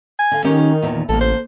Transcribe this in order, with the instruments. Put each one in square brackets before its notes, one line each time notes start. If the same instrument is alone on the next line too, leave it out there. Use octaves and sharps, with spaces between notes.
[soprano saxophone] G#5
[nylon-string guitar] D3 F5
[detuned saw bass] D#3 [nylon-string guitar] C#4 G4 [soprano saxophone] D#4
[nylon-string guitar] E2 A#2
[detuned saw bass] A1 [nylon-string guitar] D3 A#3 [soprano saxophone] A4
[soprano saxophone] C5